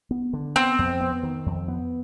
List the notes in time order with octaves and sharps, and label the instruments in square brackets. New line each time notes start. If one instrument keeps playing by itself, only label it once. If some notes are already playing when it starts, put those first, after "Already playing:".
[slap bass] B3
D3
[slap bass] B3 [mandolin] C4
[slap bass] F2
B3
D#3
F2
B3